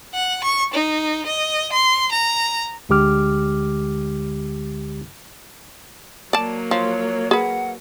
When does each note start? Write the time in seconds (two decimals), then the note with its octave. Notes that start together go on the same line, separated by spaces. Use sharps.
0.14 F#5
0.44 C#6
0.74 D#4
1.26 D#5
1.73 C6
2.12 A#5
2.89 D2 D3 G#3 G4 D6 F6
6.33 F#3 A#3 D5 A5
6.71 F3 C#5
7.31 G#4 B4 F#5